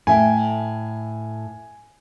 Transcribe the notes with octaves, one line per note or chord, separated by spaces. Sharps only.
A2 E5 G5 G#5